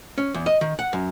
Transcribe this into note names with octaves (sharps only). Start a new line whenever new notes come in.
C#4
E2
D#5
D#3
F#5
F#2